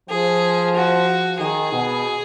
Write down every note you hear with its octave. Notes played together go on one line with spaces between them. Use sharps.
F3 G#4
F#4
D#3 G#4
B2